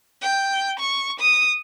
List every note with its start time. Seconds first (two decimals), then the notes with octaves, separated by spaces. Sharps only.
0.22 G5
0.79 C#6
1.19 D#6